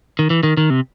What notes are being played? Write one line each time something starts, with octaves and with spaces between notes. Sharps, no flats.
D#3
E3
D#3
D#3
C3